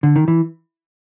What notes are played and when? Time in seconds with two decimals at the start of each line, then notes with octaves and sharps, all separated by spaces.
0.03 D3
0.16 D#3
0.28 E3